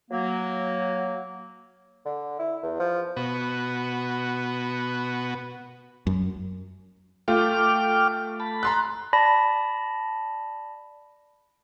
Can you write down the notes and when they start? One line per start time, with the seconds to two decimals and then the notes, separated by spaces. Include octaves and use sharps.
0.11 F#3 A#3
2.05 D3
2.39 E4
2.63 E2
2.79 F3
3.16 B2 B3 F#4
6.07 F#2
7.28 A3 F4 G5 D6 F6
8.40 A5 B5
8.63 A#5 C6 F#6
9.13 D5 A5 B5 A#6